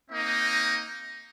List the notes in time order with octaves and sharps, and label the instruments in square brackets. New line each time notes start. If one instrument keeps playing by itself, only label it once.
[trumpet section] A#3 C4 D#4 D#5